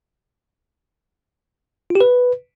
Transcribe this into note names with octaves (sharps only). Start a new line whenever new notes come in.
F4
G4
B4